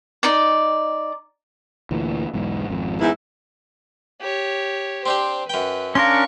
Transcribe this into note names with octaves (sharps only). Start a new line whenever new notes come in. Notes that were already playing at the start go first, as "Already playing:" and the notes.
D#4 D5 D6
D2 A#2 E3
B1 E2 G#2
G#1 F2
E2 G#2 E4
G4 C#5
C4 D4 G4 C5
F#2 B4 G5
C#4 D4 A#4 F5 C6 C#6